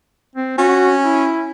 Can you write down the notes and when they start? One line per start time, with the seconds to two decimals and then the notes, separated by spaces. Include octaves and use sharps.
0.36 C4
0.58 C#4 F#4
1.05 E4